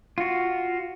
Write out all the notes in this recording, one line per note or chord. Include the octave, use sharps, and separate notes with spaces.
F4 F#4